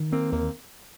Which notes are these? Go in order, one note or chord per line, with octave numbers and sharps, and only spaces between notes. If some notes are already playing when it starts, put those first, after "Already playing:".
Already playing: D#3
A#3 C4
D#2 A#3